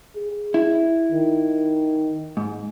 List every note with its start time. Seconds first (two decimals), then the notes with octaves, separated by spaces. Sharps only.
0.16 G#4
0.54 E4
1.11 D#3
2.37 G#2